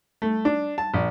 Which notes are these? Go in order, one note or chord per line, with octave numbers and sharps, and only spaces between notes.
A3
D4
A5
A#1